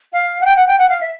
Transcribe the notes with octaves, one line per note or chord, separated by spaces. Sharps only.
F5
F#5
G5
F#5
G5
F#5
F5
E5